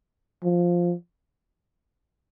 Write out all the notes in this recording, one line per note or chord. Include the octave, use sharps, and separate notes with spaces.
F3